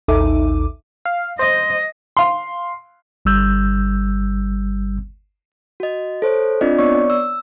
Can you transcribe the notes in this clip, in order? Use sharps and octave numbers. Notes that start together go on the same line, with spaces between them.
A1 D#2 D#4 A4 E5 D6
F5
C5 D#5
F5 C6
G1 G3 E6 G6
F#4 D#5
A4 C5 C#5
C4 D4 F4 D5 D#5
B3 C#5 D5 C#6
E6